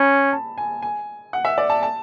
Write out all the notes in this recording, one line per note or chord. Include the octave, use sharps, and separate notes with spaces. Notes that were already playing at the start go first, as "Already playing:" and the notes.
Already playing: C#4 B5
A5
G#5
G#5
F#5
E5
D5
A5
A5